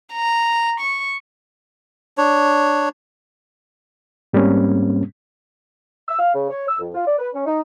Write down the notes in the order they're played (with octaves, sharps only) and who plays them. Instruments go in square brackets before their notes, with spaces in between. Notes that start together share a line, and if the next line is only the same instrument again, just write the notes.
[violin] A#5
C#6
[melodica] D4 C#5
[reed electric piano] G#2 G3 A#3 C4 C#4
[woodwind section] E6
F5
C#3
C#5
E6
F2
F4
D5
B4
C#4
D#4